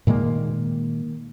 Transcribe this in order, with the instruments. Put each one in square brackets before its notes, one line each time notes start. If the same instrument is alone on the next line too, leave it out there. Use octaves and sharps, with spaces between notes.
[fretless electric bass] A#2 D#3 G#3 A#3